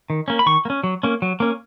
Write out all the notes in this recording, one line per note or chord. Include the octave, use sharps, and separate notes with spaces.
D#3
A#3 C#4
B5
D#3 C#6
A#3
C#4
F#3
A#3 C#4
F#3
A#3 C#4